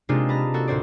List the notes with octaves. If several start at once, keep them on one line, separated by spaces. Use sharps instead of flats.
C3 G#3 A#3 D4 D#4 F4
B4 A5 A#5
A#3 F#4 A4
D2 A2 A#3 F#4 C5 D5